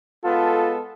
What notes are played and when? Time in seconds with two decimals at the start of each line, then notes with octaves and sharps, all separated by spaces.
0.24 G#3 B3 F4 A4